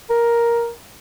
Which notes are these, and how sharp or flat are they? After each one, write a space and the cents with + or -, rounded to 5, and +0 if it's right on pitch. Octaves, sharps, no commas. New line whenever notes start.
A#4 +10